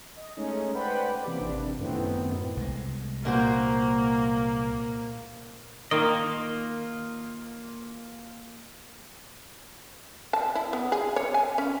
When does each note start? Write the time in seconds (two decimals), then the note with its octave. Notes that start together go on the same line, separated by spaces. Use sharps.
0.16 D#5
0.37 G#3 A3 C#4 D#4
0.75 B4 C5 D5 F#5 G5 B5
1.23 C3 E3 A#3 G4 B5 D6
1.40 G#1 C3 D4
1.78 F#2 A2 D#3 B3 C4
2.57 C2 G#3
3.25 A#2 A#3 F#4 C5
5.91 D#3 A#3 F4 D#5
10.33 A5
10.55 E4
10.73 B3
10.92 G#4
11.16 C#5
11.34 G#5
11.58 C#4